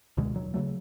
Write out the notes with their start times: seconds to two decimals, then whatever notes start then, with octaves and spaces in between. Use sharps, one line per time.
0.17 C#2 B2 D3 G#3
0.34 D#1 D#2 F#3
0.54 C#3 E3 F#3 A3